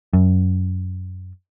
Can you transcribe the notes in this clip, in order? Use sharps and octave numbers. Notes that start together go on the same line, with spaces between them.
F#2